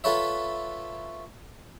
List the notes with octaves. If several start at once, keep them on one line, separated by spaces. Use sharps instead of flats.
F4 A4 B4 C#5 E5